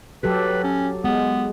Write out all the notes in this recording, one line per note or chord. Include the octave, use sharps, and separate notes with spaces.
F#3 G4 A4 B4
C#4
G#3 B3